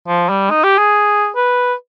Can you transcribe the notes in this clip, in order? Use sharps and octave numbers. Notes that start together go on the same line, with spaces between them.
F3
G3
D#4
G4
G#4
B4